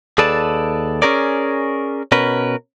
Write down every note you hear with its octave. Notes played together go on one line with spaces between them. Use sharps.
D#2 G#4 A4 B4 D5 A5
C#4 G#4 A#4 D5
B2 C#4 A#4 B4